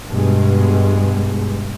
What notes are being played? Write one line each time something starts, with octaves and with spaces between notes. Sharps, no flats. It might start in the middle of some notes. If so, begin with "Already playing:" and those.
G2 B2 G#3